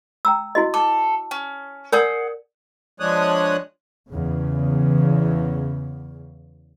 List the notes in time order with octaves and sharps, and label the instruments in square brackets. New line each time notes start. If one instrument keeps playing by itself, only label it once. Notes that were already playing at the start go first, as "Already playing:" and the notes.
[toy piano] G5 A#5 E6
E4 F#4 D#5
[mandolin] A4 [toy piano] D6
[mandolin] C#4
[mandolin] G#4 F#5 G6 [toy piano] A#4 D5
[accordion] F3 G#3 D4 C#5 D#6 F#6
[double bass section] E2 C#3